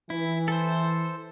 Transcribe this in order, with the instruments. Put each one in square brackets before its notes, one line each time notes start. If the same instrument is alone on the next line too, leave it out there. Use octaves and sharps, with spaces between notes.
[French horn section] E3 [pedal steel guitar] E4
[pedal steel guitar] A4 C5